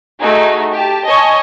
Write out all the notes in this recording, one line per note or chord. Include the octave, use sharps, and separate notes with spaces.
A3 D#4 F#4 G#4
G4 A5
C#5 D#5 G#5 A5 C#6